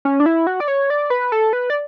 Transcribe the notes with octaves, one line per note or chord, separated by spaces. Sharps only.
C#4
D4
E4
F#4
D5
C#5
D5
B4
A4
B4
D5